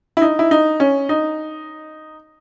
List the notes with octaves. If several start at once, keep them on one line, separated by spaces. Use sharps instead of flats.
E4
D#4
E4
D#4
C#4
D#4